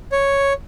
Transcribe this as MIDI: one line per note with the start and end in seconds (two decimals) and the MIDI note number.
0.12 0.53 73